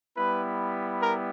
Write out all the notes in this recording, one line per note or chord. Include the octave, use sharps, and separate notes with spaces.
G3 B3 E4 B4
A#4